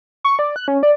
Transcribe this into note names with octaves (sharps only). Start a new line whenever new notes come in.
C#6
D5
F#6
C#4
D5